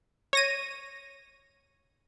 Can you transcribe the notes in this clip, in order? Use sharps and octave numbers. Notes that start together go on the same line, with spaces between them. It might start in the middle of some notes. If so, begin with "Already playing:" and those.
C#5 A#6 D#7